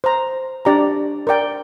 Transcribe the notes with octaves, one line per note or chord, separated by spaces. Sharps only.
C5 A#5
D4 G4 D5 A#5
A#4 D5 G5